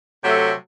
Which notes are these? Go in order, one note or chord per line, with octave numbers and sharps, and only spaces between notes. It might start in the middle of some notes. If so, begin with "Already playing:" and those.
C3 F#3 A3